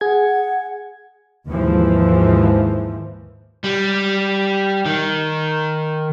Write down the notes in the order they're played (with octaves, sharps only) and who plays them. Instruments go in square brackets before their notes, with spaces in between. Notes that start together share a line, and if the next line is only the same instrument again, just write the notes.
[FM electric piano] G#4 G#6 [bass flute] F#5
[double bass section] D#2 G#2 E3 F3
[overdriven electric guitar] G3
D#3